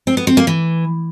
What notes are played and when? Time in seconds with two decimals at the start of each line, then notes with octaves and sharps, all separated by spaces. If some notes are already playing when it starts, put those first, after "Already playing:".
0.07 C4
0.17 B3
0.27 C4
0.37 A#3
0.47 E3